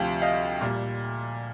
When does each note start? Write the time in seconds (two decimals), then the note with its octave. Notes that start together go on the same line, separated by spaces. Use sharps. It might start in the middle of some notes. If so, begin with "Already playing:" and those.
Already playing: D2 C3 F3 F5 G5
0.22 D#5 F5
0.61 A#2 G3